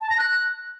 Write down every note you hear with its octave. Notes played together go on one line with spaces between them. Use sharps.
A5
A#6
F#6